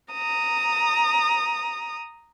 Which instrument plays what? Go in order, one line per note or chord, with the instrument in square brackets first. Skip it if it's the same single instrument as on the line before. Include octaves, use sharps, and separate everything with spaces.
[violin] A#5 D#6